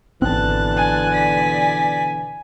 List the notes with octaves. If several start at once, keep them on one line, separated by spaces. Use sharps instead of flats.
G#1 B2 D3 E3 C4 A5 F#6
G#5
D5 B6